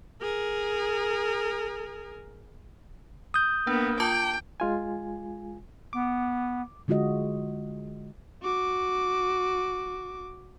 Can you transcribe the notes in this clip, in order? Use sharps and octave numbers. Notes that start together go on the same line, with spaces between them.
G#4 A#4
D#6 G6
A#3 B3 D4
F4 G5 A5 D6
G#3 F4 G#5
B3 D6
D3 G#3 F4 F#4 D#5
F#4 D6